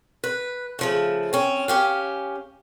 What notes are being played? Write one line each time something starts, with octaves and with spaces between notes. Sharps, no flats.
B4
C#3 F3 A3
C4 C#4
C#4 G4 F5